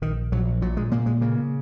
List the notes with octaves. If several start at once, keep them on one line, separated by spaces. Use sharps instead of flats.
A#1 D#3
A#1 F#3
A#2 F#3
G#3
A#2 A#3
G#3
C#3 A#3